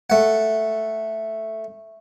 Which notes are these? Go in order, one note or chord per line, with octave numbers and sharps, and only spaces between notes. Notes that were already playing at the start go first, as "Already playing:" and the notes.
A3 F#5